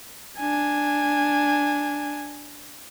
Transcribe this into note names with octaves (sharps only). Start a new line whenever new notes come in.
D4 G#5